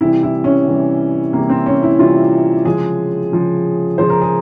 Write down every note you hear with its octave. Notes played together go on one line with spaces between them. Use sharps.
C3 E3 G3 E4
E4
C#4
C3 E3 G3
C3 E3 G3 A#3
C4
C#4
E4
C3 E3 G3 F4
C#3 F3 G#3 G#4
C#3 F3 G#3
C#3 F3 G#3 C5
A#4
G#4